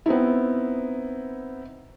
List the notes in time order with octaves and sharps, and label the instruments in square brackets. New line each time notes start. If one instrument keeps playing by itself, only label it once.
[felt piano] B3 C4 D#4 E4